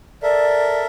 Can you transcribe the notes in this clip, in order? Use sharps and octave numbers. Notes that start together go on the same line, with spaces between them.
A4 A#4 D5 E5